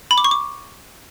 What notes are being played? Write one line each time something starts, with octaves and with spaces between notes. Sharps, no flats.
B5
D6
C#6
D6